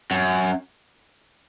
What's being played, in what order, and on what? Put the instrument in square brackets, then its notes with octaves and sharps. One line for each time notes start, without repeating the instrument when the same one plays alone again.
[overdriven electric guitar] F#2